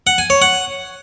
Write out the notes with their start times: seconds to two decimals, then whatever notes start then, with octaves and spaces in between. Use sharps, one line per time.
0.07 F#5
0.18 G#5
0.30 C#5
0.42 F#5